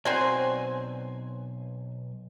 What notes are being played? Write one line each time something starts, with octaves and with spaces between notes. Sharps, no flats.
B1 F#3 C4 C5 D5 G#5 C6